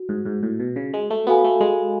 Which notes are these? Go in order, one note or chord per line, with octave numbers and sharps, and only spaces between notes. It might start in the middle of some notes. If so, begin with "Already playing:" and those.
Already playing: F#4
G#2
G#2
A2
B2
C#3
G#3
A3
B3 F#4 A4 F5 G#5 B5
A3
G#3